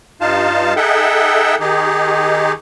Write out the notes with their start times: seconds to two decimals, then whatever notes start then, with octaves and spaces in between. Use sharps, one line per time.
0.21 G2 D#4 F4 F5 A5
0.76 D#4 G#4 A4 E5 F#5 G5
1.60 D#3 D#4 G4 G#4